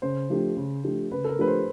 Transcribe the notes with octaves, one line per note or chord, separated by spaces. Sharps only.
C#3 C5
F3 A3 D4 G4
C#3
F3 A3 D4 G4
C#3 B4
A4
A#4
F3 A3 D4 G4 B4
C5